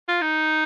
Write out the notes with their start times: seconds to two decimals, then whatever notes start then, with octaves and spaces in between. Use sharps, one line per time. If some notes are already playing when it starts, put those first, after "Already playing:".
0.08 F4
0.21 D#4